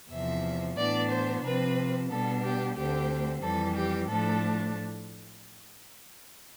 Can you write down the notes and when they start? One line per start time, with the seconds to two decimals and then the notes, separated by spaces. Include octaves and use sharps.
0.10 E2 C3 F3 E5
0.77 A2 E3 B3 D4 D5
1.10 C5
1.43 C3 F3 C4 B4
2.10 B2 G3 B3 D4 A4
2.42 G4
2.76 D2 D3 A3 C4 G4
3.42 F2 E3 G3 A4
3.75 G4
4.08 A2 F3 A3 D4 A4